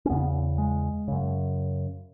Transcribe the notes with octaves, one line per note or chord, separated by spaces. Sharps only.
C#4
E2 C#3 B3
G#3
F#2 C#3